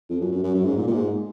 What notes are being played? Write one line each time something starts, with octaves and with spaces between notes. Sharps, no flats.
F2
F#2
F#2
F#2
F#2
G#2
A#2
A#2
G#2